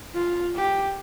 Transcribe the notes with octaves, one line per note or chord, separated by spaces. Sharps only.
F4
G4